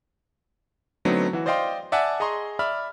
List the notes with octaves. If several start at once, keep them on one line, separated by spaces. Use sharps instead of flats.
D3 F#3 A3 B3 C4 D#4
E3 F#4
C5 D5 D#5 F5 G5 C6
D5 E5 F#5 G#5 A5
G#4 D#5 A#5 C6 C#6
D5 E5 B5 F6